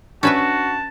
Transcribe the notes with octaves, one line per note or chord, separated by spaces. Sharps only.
C#4 D4 F#4 B4 E5 A5